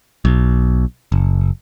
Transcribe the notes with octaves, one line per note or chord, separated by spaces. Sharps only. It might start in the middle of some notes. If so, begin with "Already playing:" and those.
B1
F#1